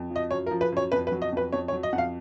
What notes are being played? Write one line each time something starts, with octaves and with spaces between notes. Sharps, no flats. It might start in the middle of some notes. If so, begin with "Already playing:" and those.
Already playing: F2
F3
D#5
F#2 C#5
A#4
F3
B4
F#2 C#5
F2 B4
B4
F#3
D#5
F2 B4
F2 C#5
C#5
F#3
D#5
F2 F#5
F5